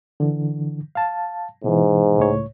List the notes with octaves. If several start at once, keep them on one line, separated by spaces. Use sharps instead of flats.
D3 E3
F5 A5
G#2 B2 E3
C#2 A2 C#5